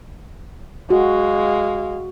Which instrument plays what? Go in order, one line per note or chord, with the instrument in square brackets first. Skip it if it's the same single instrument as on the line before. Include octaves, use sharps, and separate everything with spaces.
[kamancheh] G#3 F5 [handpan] F#4